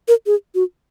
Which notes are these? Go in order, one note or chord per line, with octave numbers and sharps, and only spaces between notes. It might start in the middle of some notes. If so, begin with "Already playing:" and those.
A#4
G#4
F#4